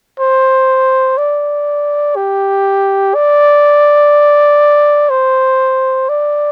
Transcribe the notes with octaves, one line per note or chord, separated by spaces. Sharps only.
C5
D5
G4
D5
C5
D5